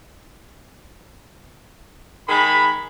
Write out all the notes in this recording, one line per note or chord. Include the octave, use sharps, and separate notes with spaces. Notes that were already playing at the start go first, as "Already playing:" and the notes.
D#3 G#3 G#4 B5